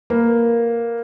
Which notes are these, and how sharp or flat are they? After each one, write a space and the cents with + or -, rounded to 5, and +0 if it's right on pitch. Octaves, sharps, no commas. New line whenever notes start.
A#3 +0 B4 +0